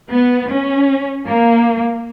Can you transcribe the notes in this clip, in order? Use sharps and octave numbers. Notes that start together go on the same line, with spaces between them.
B3
C#4
A#3